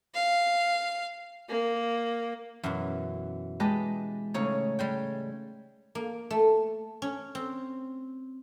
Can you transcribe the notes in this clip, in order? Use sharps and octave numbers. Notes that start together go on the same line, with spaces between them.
F5
A#3
F#2 B2 E3 F#6
G#3 G4 B4 D#5 A5 F#6
A2 C#3 A3 C#4 D#4 C#5
G3 G#3 G5
A#3
A3
C#4
C4